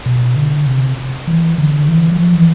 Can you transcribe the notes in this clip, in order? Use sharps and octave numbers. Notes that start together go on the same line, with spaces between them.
B2
D3
C3
E3
D3
E3
F3
E3